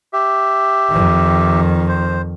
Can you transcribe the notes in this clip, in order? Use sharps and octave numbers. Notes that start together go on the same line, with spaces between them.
G4 E5
F2 D#3
C5